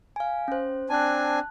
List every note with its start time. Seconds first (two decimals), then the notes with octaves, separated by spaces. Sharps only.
0.16 F5 G#5
0.48 C#4 C5
0.90 C4 D4 G#5 A5 F#6